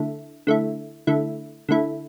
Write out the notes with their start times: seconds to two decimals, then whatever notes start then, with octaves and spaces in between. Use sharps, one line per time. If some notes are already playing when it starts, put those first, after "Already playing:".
Already playing: D3 A3 E4
0.47 D3 A3 E4
1.07 D3 A3 E4
1.69 D3 A3 E4